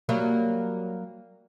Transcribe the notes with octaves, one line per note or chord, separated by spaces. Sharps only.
F#3 G3 A#3